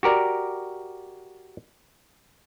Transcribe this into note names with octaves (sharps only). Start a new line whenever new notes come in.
F#4 G4 A#4 D5